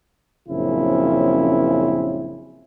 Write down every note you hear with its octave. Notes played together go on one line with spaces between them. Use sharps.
A#1 F#2 C#3 C4 C#4 E4